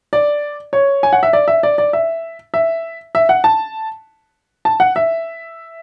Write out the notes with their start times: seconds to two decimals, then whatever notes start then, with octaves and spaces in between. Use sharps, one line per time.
0.13 D5
0.73 C#5
1.03 G#5
1.13 F#5
1.23 E5
1.33 D5
1.48 E5
1.63 D5
1.78 D5
1.93 E5
2.54 E5
3.15 E5
3.29 F#5
3.44 A5
4.65 A5
4.80 F#5
4.96 E5